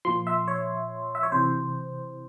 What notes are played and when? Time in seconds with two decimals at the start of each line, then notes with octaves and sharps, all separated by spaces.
0.05 A#2 F3 C6
0.27 E5
0.48 C#5
1.15 E5
1.23 C#5
1.32 C3 E3 C5